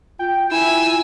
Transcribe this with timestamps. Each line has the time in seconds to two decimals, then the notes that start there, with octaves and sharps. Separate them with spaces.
0.19 F4 G5
0.51 E4 G#5 E6